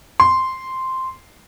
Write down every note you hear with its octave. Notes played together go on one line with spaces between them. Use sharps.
C6